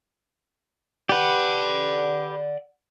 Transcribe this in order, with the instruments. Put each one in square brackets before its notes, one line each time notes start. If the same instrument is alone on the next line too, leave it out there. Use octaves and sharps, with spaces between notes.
[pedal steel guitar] G4 B4 [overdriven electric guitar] D5 F#5